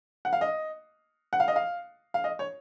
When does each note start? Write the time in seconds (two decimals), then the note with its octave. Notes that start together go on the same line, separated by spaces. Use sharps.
0.25 F#5
0.33 F5
0.41 D#5
1.33 F#5
1.40 F5
1.48 D#5
1.56 F5
2.14 F5
2.24 D#5
2.39 C#5